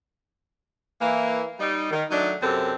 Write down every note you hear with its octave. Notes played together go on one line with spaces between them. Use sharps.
E3 A#3
G3 D#4
D#3
F#3 A3 D4 D#4
F#2 C3 C4 A4